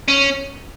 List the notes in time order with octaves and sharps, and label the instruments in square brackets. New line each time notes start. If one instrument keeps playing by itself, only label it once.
[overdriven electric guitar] C#4